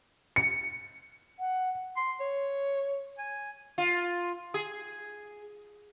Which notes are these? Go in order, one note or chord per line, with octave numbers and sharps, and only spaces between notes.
C#7
F#5
C6
C#5
G#5
F4
G#4